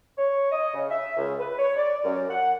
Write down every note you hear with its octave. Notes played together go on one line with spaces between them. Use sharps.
C#5
D#5
C#3
E5
C#2
B4
C#5
D5
F#2
F#5